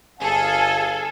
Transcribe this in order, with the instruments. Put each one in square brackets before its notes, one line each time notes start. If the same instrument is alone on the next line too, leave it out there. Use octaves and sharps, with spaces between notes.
[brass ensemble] G1 F5 G#5 [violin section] G#4 A4